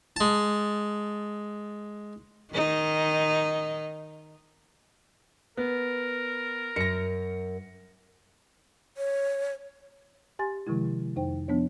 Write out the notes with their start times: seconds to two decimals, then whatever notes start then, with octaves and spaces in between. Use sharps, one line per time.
0.16 G#3 A5
2.54 D#3 D#4
5.57 B3 A#4
6.76 F#2 A#6 C#7
8.97 C#5
10.39 G4 G#5 C6 A6
10.67 C3 D#3 F3 G#3 E4
11.16 F2 D#4 C5 G5
11.48 F3 B3 D4 C#5